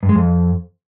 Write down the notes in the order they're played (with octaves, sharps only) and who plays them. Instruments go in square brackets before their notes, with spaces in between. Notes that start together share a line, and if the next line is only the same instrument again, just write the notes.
[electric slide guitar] G2
G#3
F2